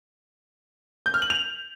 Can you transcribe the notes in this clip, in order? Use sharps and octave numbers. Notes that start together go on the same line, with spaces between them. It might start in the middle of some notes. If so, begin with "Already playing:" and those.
G6
F6
F#7
F7